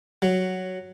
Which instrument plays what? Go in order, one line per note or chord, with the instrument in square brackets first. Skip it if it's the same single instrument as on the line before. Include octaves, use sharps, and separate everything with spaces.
[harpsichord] F#3